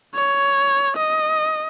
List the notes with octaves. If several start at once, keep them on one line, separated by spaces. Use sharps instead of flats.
C#5
D#5